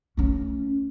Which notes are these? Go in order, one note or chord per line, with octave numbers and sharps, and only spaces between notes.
A3 C#4